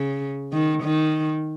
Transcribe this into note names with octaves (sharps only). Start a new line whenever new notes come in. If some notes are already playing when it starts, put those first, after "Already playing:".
Already playing: C#3
D#3
D#3